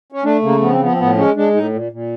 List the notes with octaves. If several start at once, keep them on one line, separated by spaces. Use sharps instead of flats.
C#4
A3 D4
C#3 A#3
F3 B3
C4
F3 B3
C4
A2 B3
G#3 C#4
G#3 D4
A2 D#4
A#2
A#2